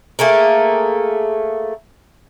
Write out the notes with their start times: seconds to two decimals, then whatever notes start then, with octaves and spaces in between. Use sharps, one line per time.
0.19 A3 A#3 G#4 A#4